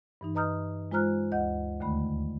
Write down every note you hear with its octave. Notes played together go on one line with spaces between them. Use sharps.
G2 E3 D#4
B4 D#5 A#5 D#6 F6 G6
G#3 F4 C5 A#5 F6 F#6
D2 D#5 F#5 G6
D#2 D3 D#3 A3 B5